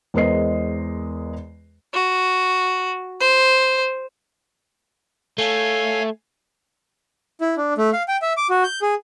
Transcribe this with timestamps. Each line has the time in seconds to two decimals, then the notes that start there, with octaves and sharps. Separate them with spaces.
0.14 E2 G#3 A#4 C5 D#5 C7
1.94 F#4
3.20 C5
5.38 A3 C#5 F5 G#5
7.41 E4
7.57 D4
7.78 A3
7.93 F5
8.08 G5
8.22 E5
8.37 D6
8.50 F#4
8.64 G6
8.82 G#4